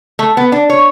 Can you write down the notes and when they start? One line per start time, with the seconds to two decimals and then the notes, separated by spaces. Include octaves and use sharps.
0.19 A3
0.37 B3
0.52 D4
0.70 C#5